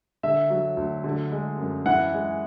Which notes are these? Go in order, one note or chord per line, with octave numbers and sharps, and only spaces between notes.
D3 E5
F#3
D2
D3
G#3
F#2
E3 F#5
G#3